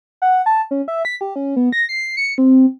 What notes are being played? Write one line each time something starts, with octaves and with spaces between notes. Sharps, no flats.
F#5
A5
C#4
E5
B6
G4
C#4
B3
A#6
C7
C#7
C4